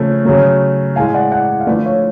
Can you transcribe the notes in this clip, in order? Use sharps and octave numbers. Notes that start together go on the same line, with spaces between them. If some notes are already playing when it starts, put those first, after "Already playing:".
Already playing: C#3 F3 A3
C#3 F#3 A3
A2 G#3 F5 G#5
D5 F#5
D5 F#5
F5
D3 F3 A3 B4 D5
C#5 F5